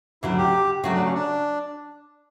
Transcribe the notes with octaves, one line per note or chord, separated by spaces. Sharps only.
D2 C#3 F#3 E4
G4
C#3 F#3 A3 F#4
D4
C#4
D4